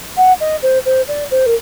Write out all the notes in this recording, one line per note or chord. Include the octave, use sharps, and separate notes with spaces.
F#5
D#5
C5
C5
D5
C5
A#4